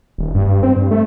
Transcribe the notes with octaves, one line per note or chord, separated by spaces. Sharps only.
D#1
G2
C4
G2
A3